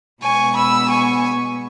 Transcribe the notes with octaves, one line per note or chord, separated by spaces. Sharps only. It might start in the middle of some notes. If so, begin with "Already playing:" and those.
B2 G#3 B3 G#5 C#6
B5 E6
G#5 C#6